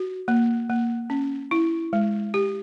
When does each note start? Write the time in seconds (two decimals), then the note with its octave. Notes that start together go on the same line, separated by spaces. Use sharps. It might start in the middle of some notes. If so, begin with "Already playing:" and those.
Already playing: F#4
0.28 A#3
0.69 A#3
1.10 C#4
1.51 E4
1.93 G#3
2.34 G4